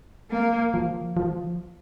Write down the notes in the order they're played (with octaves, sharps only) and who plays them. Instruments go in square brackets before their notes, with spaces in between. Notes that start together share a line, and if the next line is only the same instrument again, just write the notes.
[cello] A#3
[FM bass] F3
F3